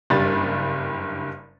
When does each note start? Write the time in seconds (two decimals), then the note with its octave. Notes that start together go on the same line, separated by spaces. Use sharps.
0.10 F#1 G2 G3 B5 A6